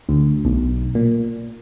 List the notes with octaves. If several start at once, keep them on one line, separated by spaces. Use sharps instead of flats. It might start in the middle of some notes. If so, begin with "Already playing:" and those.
D2
B1
A#2